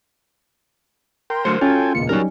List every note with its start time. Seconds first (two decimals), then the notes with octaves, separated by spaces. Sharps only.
1.30 A#4 G5 C6
1.45 D3 F#3 A3 A#4 C5 C#7
1.61 C#4 F4 F#4 A4 C#5 G5 G#5
1.95 E1 C#2 A#2 C#7
2.09 F#3 G3 C#4 D#4 F#4 A#4